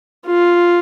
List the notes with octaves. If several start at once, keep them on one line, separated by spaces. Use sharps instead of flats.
F4